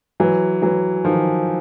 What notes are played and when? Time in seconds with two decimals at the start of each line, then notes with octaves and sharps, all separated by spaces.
0.20 E3 F#3
0.62 E3 F#3
1.04 D#3 F3